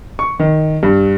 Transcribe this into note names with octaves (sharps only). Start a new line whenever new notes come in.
C#6
D#3
G2